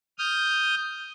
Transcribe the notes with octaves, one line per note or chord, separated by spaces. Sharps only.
D#6 F6 G6